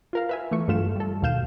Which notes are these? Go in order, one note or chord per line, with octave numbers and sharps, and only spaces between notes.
F4 A#4 F5
B4 E5 G#5
E3 A3 C#6
G2 F#3 A3 F4 F5 E7
G3 A4
D#2 B2 F5 G6 E7